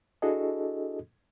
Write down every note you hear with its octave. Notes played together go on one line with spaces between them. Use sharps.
D4 E4 F#4 G#4 A4 D#5